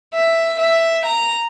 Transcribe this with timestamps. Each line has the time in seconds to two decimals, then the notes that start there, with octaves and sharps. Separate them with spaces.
0.14 E5
0.60 E5
1.06 A#5